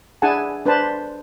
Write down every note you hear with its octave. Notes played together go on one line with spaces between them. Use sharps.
D4 E4 G#4 F#5 G#5 A5
D4 B4 C5 A5